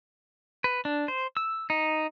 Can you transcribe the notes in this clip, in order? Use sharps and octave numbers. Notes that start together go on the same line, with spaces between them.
B4
D4
C5
E6
D#4